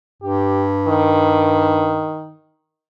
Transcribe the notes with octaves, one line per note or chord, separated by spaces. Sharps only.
G2 G4
D#3